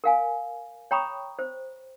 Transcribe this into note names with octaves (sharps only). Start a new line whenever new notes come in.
A#4 F5 G#5
C#5 G5 A#5 B5 C#6 D#6
C5